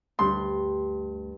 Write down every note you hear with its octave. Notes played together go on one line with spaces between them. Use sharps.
D2 G2 A3 C6